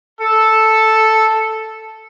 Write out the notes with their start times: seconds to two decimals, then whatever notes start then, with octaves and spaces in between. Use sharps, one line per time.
0.21 A4 E6